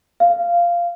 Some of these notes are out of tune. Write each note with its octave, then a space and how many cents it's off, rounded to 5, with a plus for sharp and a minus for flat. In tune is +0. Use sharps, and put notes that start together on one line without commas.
F5 -10